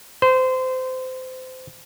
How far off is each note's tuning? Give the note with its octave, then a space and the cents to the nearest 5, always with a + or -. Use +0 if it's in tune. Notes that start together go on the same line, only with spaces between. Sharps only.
C5 -25